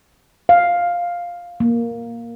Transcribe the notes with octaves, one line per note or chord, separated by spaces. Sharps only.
F5
A#3